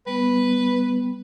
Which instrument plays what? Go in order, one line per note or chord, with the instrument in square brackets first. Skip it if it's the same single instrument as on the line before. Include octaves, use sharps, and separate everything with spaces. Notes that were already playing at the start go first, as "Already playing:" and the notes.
[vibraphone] G3 B3 [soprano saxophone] B4